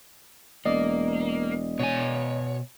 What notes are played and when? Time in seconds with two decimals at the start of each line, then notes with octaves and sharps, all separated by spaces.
0.66 E1 A#3 D5 D#5
1.79 B2 C#5 G#5